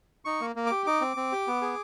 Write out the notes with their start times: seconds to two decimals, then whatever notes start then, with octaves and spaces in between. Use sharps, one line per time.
0.25 D#4 C#6
0.41 A#3
0.56 A#3
0.66 G4 D6
0.86 D#4 D6
1.01 C4
1.17 C4
1.32 G4
1.47 B3
1.62 G#4